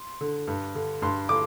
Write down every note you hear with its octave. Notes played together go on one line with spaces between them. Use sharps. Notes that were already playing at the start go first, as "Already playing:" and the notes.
Already playing: C6
D3
G2
D3
G2 C6
D3 D6